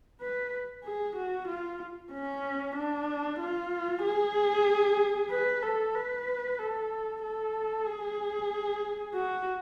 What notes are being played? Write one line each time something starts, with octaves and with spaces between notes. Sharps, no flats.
B4
G#4
F#4
F4
C#4
D4
F4
G#4
B4
A4
B4
A4
A4
G#4
F#4